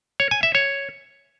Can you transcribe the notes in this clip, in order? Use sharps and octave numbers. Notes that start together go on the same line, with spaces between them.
C#5
G#5
E5
C#5